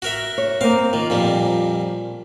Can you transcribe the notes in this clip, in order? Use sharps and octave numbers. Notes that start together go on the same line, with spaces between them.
F#4 A#4 E5
C#5
A#3 C4 F5
D#3 F4
F2 A#2 G3